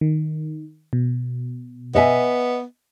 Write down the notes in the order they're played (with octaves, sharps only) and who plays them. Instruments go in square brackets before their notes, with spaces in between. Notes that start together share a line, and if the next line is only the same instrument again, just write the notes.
[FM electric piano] D#3
B2
[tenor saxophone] B3 [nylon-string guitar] D#5 E5 G#5